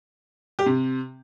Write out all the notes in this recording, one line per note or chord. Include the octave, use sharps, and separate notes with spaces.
G4
C3